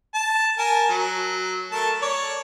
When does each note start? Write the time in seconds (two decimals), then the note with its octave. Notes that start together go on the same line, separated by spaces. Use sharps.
0.14 A5
0.58 A#4 G#5 A5
0.89 F#3
1.72 A3 A#4 A5
2.02 C#5 D5